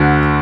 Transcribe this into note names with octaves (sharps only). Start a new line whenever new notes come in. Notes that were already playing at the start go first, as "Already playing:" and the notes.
Already playing: D2 D3 F#4